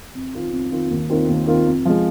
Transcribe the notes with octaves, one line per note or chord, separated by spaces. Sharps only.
F2
D#3 C4 F4
F2
D#3 C4 F4
D#2
D#3 C4 F4
D#2
D#3 C4 F4
F2
F3 G#3